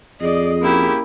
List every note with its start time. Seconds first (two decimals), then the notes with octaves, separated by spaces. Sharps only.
0.21 F2 G#4 D5 D#5
0.62 A#3 C#4 E4 G4